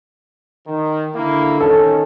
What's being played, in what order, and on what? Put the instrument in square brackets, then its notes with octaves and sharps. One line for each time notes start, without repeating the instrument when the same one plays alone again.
[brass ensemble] D#3
D3 A#3 E4
[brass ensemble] D#3 C#4 [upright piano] A4